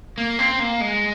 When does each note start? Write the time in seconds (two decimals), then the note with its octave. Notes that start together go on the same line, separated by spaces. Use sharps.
0.18 A#3
0.39 C4
0.59 A#3
0.81 G#3